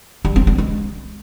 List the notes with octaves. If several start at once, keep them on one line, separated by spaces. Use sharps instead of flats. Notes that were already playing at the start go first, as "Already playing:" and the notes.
G3
C4
D4
G#3